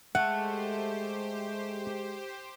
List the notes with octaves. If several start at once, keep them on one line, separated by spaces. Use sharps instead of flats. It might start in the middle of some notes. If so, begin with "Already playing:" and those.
G#3 A3 G4 C5 F#5